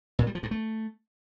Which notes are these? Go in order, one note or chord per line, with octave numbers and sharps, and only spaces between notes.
A#2
G3
F3
G2
A3